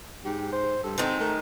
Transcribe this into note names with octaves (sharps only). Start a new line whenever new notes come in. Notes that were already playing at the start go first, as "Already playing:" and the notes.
G#2 G4
C5
G2 A4
D#3 G#3 C4
A3 A#4